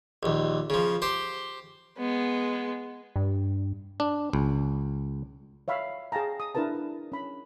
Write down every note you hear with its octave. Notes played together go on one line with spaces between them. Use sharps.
A#1 D#2
C#3 F3
G4 C5
G#3 B3
G2
D4
C#2
C#5 E5 F5 B5
G#4 F5 G5 A5 A#5
D#6
D4 E4 A#4 B4 A5
A#4
C#4 B5